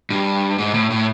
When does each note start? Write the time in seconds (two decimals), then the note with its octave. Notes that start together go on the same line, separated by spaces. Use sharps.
0.10 G2
0.58 G#2
0.74 A2
0.90 A2